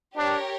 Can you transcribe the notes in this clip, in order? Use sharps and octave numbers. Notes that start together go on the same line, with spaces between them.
D4 G4 A#4 C#5